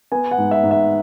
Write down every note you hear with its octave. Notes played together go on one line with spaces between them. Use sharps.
B3 G#5
F#5
G#2
E5
G#2
E5